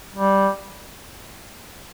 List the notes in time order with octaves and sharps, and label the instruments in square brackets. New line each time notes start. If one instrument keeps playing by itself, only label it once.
[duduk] G3